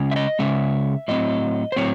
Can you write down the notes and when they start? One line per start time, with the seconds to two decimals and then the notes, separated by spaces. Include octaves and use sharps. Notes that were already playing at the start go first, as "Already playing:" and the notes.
Already playing: C#3 G#3 C#4
0.11 E5
0.16 D#5
0.39 C#3 G#3 C#4 E5
1.08 A2 F#3 C4 D#5
1.72 C5
1.76 A2 F#3 C4 C#5